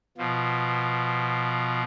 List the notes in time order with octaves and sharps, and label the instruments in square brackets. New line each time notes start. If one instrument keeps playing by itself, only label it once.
[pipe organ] B2 F3